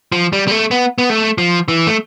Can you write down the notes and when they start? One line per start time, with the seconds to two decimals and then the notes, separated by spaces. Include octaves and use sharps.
0.12 F3
0.33 G3
0.48 G3
0.51 A3
0.71 B3
0.98 B3
1.10 A3
1.38 F3
1.68 E3
1.87 A3